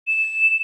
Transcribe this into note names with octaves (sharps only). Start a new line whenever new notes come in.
E7